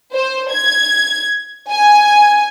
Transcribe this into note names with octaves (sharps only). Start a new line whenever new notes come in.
C5
G#6
G#5